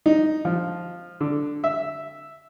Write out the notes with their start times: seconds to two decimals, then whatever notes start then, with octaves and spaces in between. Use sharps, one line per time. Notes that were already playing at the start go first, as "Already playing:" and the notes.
0.06 D#4
0.45 F3
1.21 D3
1.64 E5